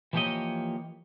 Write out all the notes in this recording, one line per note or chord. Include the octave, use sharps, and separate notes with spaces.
E3 F3 A#3 G4 C#5 D#5